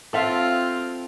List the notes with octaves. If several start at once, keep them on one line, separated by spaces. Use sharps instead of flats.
C4 F4 A4 E5 F5